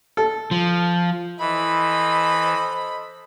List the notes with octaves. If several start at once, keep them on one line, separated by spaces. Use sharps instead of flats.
A4
F3
E3 A4 C5 D#5 B5